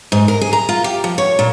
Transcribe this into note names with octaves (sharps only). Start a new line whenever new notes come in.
G#2
A#4
G#4
A#5
F4
G4
F3
C#5
A#2